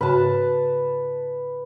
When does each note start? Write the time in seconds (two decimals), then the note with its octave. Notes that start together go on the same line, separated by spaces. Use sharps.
0.01 G#2 C#3 F#4 B4 A5